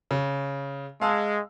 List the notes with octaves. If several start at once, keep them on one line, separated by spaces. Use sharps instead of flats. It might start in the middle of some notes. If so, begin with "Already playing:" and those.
C#3
G#3 F5 A5 E6